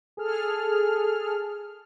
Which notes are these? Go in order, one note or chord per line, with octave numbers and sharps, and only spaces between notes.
G#4 A4 F6